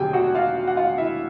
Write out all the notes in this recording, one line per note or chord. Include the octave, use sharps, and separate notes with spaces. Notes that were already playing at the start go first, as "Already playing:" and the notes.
Already playing: E1 D2 D3 F#3 G4 G#4 G5 G#5
F#4 F#5
F4 F5
F#5
F4 F5
E4 E5